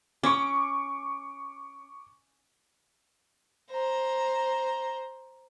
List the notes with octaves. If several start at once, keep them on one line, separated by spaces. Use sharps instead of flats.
C#4 C#6 D6
C5 A#5